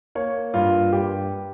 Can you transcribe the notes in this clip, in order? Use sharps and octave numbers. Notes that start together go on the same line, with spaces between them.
A#3 C#5
G2 F4
G2 G4